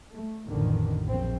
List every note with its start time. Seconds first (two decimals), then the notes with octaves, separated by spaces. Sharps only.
0.12 A3
0.48 A1 F2 D3 D#3
1.04 A#1 F#2 C4